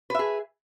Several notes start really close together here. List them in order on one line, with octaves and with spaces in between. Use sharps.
B4 E5 G#4